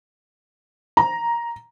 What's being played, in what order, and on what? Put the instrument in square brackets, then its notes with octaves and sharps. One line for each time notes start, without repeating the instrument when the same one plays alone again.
[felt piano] A#5